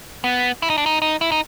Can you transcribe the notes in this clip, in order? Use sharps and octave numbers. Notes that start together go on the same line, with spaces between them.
B3
E4
D#4
D4
D#4
D#4
E4
D#4